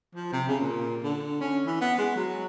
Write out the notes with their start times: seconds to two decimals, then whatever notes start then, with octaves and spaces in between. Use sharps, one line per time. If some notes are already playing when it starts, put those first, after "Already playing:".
0.15 F3
0.33 C3
0.48 C#3
0.60 A#2
1.03 D3
1.41 C#4
1.66 E3
1.81 B3
1.98 G#3
2.16 F#3